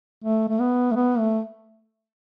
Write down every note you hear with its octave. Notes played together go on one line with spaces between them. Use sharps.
A3
A3
B3
A3
B3
A3